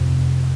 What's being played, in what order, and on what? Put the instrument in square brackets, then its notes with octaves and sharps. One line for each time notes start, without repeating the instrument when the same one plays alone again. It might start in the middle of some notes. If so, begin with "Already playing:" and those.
Already playing: [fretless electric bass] F2 C3